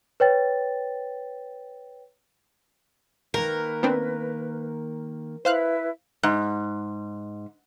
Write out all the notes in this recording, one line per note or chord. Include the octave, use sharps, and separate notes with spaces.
B4 C#5 G5 A6
D#3 A#3 A#4 B4
B3 C4 D4
E4 B4 C5 F5 F#6
G#2